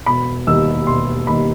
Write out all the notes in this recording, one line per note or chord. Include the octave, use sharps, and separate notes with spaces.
E1 B5
D#2 D#3 G3 E6
E1 C6
D#2 D#3 G3 B5